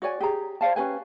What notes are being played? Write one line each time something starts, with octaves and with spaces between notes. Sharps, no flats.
F#4 C#5 D5 G#5
G4 G#4 A#5
C5 D5 F5 A5
C#4 G4 B4 G#5